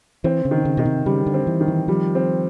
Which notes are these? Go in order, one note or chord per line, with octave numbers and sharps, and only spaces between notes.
E3 C4
C#3
D#3
C#3
B2 D#3
C3
C#3 G3
D3
C4
E3
D#3
E3
F3 G3
C4